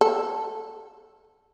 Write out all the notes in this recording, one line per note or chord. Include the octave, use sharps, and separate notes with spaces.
A4